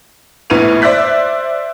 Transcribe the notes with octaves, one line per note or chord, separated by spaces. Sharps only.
A#1 A2 B3 D#7 F7
C5 D5 E5 F#6 B6